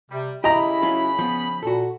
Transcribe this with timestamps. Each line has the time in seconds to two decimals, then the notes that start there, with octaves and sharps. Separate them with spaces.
0.11 C3 G3
0.44 C#3 E4 G4 D#5 A#5 B5
0.83 F#3 C#4 F4
1.19 F3 B3
1.63 A#2 F#4 A4